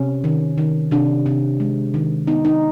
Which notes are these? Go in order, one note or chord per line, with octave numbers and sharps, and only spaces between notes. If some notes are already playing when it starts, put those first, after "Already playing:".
Already playing: C3 C#4
D#3
D#3
C3 D4
C3
G#3
D#3
B3 D#4
D#4